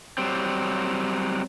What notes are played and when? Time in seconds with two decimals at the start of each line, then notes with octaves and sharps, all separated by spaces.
0.18 F#3 G3 C4